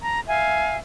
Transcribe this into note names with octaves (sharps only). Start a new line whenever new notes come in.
A5 A#5
E5 F5 G#5